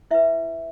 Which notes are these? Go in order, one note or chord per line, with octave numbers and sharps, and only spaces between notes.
E4 B4 E5